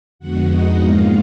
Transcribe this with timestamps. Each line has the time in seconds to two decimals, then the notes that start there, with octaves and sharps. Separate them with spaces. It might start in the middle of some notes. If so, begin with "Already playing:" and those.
0.19 F2 D3 G#3 B3 F#4 F#5
0.50 D#4 D#5
0.81 G#2 F#3 A#3 F4 F5